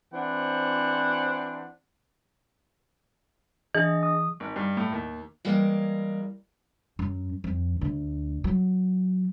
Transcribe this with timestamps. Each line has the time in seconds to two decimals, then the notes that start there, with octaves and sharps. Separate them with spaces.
0.13 E3 C4 D4 C5 F#5
3.75 E3 D4 G#4 D#5
4.03 D#6
4.40 G#1
4.56 G2
4.77 A2
4.92 D#2
5.45 E3 G3 G#3 A#3
6.99 F#2
7.44 F2
7.81 D2
8.44 F#3